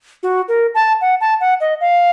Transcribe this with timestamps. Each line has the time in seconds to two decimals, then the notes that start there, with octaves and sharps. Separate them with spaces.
0.23 F#4
0.48 A#4
0.75 A5
1.01 F#5
1.21 A5
1.40 F#5
1.61 D#5
1.81 F5